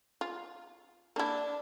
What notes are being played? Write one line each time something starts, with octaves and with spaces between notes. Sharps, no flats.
F4
A#3 D4 E4